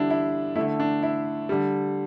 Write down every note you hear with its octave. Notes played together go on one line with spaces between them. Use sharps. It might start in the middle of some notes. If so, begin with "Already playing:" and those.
Already playing: D3 G3 D4 E4
E4
D3 A3 E4
D4
E4
D3 G3